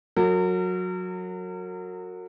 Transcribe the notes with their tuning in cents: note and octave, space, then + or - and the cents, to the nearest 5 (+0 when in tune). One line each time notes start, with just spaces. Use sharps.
F#3 -20 A#4 -40